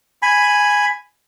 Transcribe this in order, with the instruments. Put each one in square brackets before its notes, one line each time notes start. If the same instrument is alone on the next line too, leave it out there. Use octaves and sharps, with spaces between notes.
[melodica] G#5 B5